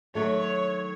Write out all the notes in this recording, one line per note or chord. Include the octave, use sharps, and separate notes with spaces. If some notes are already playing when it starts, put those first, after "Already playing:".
D#3 F#3 A3 C#5